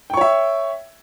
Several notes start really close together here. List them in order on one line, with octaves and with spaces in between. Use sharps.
G5 C#6 C#5 E5